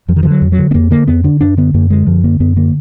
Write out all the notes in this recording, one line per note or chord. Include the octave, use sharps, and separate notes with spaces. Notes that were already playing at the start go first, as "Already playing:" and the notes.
F2 F3
D#3
D3 F3
F#3
F2
F#3
D3
B3
F2 A#3
D3 A#3
F2 B3
D3 D4
F#2 D4
D3 B3
F#2 A#3
D3 G#3
F#2 F3
D3 A#3
F#2 B3
D3 A#3